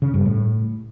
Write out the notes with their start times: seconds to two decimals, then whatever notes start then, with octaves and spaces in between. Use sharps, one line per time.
0.02 C#3
0.14 G2
0.26 A2